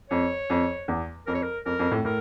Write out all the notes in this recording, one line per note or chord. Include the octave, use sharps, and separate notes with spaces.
F2 C#5
F2
E2
F2 A#4
C#5
A#4
F2 A#4
F2
F2 A2
A2 A#4